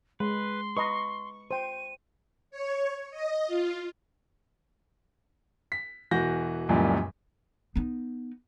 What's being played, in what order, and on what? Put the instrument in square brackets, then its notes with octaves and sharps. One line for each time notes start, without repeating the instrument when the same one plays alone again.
[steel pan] G#3 [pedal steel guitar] B4 [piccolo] C6
[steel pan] B4 D#5 A#5 [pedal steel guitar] C#6
[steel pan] C5 G5 [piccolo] D#7
[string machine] C#5
D#5
F4
[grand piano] B6
E1 E3 F#4 G6 A#6
C#2 F#2 A#2 E3 F3 G3
[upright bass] B3 D#4